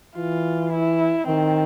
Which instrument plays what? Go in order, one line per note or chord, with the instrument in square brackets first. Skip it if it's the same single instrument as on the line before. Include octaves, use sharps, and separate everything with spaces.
[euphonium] E3 [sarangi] F4
[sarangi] E4
[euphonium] D#3 [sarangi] C4